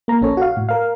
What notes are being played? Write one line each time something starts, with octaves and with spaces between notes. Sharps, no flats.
A#3 A#5
A#1 C#4 A4 C#5
F#4 F5
A2
A#4 F5